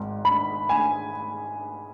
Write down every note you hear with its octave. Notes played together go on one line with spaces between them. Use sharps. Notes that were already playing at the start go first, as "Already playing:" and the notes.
Already playing: G#1 G#2
B5
G#5